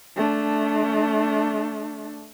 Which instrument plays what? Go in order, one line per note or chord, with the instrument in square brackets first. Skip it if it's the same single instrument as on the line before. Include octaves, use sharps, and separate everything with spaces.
[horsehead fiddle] A3 D4